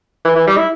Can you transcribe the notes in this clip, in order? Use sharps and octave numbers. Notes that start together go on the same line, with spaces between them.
E3
E3
G3
E4